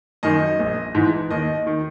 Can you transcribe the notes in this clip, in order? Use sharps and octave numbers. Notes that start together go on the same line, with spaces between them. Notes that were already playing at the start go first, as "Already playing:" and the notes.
F#2 D#3 D#5
A#1
G#2 E3
D#2 D#5
D#3